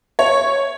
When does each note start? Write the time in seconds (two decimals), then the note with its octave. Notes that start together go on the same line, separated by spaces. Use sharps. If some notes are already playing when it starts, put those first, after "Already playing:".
0.19 C#5